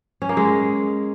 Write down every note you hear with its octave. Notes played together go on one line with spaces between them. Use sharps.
C#4
A#3
G#3